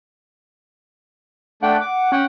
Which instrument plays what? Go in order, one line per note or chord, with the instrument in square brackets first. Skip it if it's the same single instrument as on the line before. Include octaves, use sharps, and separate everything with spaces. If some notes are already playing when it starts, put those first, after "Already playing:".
[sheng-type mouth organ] A3 D4 G5 [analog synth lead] F#5
[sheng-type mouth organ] D6
[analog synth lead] C#4 [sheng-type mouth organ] F#5 G5